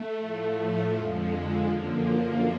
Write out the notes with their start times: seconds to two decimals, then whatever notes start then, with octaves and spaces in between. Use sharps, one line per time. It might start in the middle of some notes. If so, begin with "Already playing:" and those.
Already playing: A3
0.16 A2 F3
0.90 F2 D3 F3 G#3
1.65 F#2 D3 F3 A#3